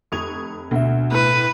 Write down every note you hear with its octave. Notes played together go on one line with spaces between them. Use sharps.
F1 C#6 D#6 G#6 F7
D2 B2 E5
A2 B4